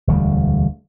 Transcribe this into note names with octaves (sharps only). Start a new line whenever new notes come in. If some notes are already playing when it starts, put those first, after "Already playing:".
E1 D2 G3